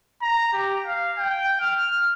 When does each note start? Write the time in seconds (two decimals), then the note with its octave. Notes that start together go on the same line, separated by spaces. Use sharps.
0.22 A#5
0.53 G4
0.86 F5
1.18 G5
1.60 F6